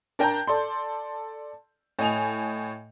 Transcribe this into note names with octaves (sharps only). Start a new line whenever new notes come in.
D4 A#4 G5 A5 A#5 G6
A4 D5 C6
A2 D#5 G#5 F7